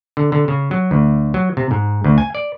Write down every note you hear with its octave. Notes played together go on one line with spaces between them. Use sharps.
D3
D3
C#3
F#3
D2
F#3
C3
G#2
D2
G#5
D5